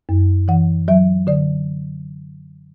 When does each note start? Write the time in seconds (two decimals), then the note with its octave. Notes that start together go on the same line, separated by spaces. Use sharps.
0.09 F#2
0.48 E3 F#5
0.88 F#3 E5
1.27 D3 D5